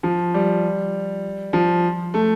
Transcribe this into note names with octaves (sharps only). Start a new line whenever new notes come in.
F3
G3
F3
A3